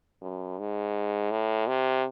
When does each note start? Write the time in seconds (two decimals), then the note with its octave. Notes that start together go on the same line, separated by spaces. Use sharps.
0.22 F#2
0.59 G#2
1.31 A2
1.67 C3